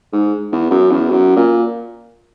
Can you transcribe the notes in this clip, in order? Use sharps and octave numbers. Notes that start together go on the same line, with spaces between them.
G#2
E2
F#2
E2
F#2
A#2